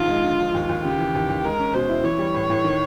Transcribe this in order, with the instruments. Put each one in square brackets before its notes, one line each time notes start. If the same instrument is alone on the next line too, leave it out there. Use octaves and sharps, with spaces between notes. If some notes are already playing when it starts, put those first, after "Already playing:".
Already playing: [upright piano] A#1 G#2 D#3 [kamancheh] F4
[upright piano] G#3
D3
F3
D#2
D#2
[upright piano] C#3 [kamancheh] G4
[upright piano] E3
D#2
D#2
[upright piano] G#3 [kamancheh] A#4
[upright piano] C#4
[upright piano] B2 [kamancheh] C5
[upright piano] E4
[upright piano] E3 [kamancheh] C#5
[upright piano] G3
A2
A2
D#3